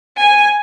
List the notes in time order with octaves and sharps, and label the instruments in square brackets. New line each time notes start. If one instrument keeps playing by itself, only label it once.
[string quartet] G#5